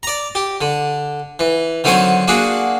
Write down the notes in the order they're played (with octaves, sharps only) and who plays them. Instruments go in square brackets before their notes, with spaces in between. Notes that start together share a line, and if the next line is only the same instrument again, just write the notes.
[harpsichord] D5 A#5
G4
D3
E3
D3 D#3 F#3 C4 G#5 C#6
A#3 D4 F#4 G#4